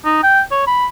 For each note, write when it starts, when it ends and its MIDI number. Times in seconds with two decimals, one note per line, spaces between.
0.05 0.21 63
0.23 0.41 79
0.51 0.64 73
0.67 0.86 83